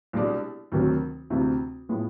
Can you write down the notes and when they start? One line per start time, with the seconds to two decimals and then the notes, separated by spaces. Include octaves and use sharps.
0.13 C2 B2 G#3 B3 D4
0.72 D2 C3 D#3 F#3
1.30 D2 C3 E3
1.89 A2 F3 G#3 B3